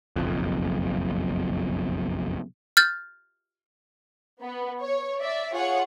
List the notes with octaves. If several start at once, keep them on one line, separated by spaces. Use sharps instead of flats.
F#1 B1 F2
F6 G6 A6
B3
C#5
D5 E5
F4 G#4 C#5 F#5